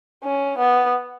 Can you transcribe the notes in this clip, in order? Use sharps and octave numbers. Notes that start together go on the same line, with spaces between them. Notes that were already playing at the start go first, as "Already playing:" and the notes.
C#4
B3